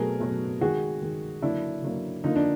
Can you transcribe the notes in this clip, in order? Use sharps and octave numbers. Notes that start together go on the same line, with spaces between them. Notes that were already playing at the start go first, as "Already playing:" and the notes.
Already playing: B2 F#3 A3 G#4 A#4
B2 F#3 A3
D#3 G#3 F#4 G#4
D#3 G#3
D3 F#3 A#3 D4 E4
D3 F#3 A#3
D3 F3 A#3 D#4
D4